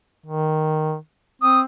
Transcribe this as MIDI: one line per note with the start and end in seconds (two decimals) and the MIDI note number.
0.26 0.96 51
1.42 1.64 60
1.42 1.60 87